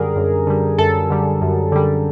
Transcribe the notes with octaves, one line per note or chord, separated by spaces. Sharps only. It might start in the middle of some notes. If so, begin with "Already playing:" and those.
Already playing: F#2 D3 G3 G#4 A#4
F#2
D3 G3
F#2 A4
D3 G3
F#2
D3 G3